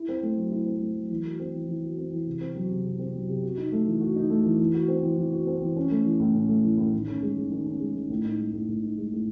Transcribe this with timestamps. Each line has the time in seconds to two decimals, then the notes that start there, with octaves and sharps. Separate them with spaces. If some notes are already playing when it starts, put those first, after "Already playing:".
Already playing: E4
0.09 C4
0.23 A3
0.37 F#3
0.51 E4
0.66 C4
0.81 A3
0.95 F#3
1.10 E3
1.25 F#4
1.40 C4
1.54 E3
1.68 E3
1.83 F#4
1.98 C4
2.12 E3
2.27 C3
2.41 C4
2.55 F#3
2.70 C3
2.85 C3
2.99 C4
3.14 F#3
3.28 C3
3.43 F#4
3.58 D#4
3.72 A3
3.87 E3
4.01 F#4
4.16 D#4
4.30 A3
4.45 E3
4.60 E3
4.74 F#4
4.88 C4
5.03 E3
5.18 E3
5.33 F#4
5.47 C4
5.62 E3
5.76 C#4
5.91 A3
6.05 E3
6.20 A2
6.34 C#4
6.49 A3
6.64 E3
6.78 A2
6.93 D#3
7.07 C#4
7.22 G#3
7.37 D#3
7.51 D#3
7.66 C#4
7.80 G#3
7.95 D#3
8.10 A2
8.25 D#4
8.39 G#3
8.53 A2
8.68 A2
8.83 D#4
8.98 G#3
9.12 A2